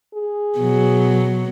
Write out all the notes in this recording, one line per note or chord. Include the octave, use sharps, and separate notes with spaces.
G#4
B2 F#3